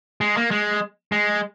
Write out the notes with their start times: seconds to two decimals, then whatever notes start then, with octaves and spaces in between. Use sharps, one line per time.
0.21 G#3
0.37 A#3
0.51 G#3
1.12 G#3